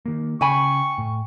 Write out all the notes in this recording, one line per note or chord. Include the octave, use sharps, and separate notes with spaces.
D#3 A#3
C#3 G5 G#5 B5 C#6
A2